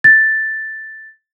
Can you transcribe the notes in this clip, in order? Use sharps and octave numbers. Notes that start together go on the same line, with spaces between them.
A6